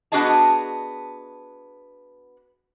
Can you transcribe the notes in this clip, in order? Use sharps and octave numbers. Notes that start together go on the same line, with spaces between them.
B3 D4 F#4 G#4 D#5 A5